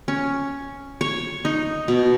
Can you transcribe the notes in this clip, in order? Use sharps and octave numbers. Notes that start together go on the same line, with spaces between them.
C#4
C#5
D#4
B2